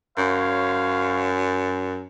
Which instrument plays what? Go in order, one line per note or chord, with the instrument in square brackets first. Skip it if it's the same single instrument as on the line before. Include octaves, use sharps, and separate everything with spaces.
[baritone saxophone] F#2 [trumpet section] C5 C#5 F5